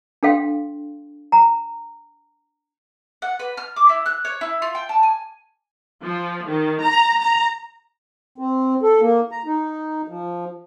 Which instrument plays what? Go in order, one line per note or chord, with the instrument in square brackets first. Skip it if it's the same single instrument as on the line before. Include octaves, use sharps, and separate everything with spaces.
[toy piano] D4 A4 F5 G5 C6
A#5
[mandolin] F#5
B4
F6
D6
E4
F#6
C#5
E4
F4
G5
A5
G#5
[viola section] F3
D#3
A#5
A#5
[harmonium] C4
A4
A#3
A#5
D#4
F3